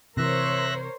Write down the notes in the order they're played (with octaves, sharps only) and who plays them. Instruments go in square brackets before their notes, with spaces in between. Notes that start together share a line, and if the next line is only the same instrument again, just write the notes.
[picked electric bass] C3 E3 [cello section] A#4 C5 C#5 [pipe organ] E5 F#6 A#6